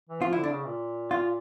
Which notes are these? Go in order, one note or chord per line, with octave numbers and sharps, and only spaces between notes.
E3
F3 F4
E4
D3
D4
C#3
A#2
F4